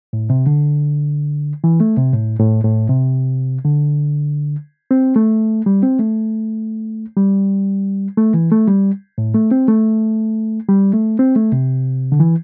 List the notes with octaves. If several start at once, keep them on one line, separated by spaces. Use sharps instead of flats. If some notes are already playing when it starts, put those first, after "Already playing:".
A2
C3
D3
E3
A3
C3
A2
A2
A2
C3
D3
C4
A3
G3
C4
A3
G3
A3
E3
A3
G3
A2
A3
C4
A3
G3
A3
C4
A3
C3
D3
E3